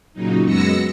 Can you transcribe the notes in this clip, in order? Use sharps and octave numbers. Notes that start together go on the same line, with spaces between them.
A#2 C#3 F#3 D#4
F#2 G#3 B3 E6 A#6 C#7